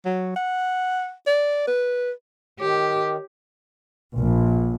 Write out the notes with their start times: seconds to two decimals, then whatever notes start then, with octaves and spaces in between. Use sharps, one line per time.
0.05 F#3
0.36 F#5
1.27 D5
1.67 B4
2.60 D#3 G4 C#5 D6
4.17 A#1